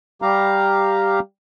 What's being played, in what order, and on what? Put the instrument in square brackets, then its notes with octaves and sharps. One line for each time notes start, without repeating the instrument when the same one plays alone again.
[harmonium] G3 G4 F5 A#5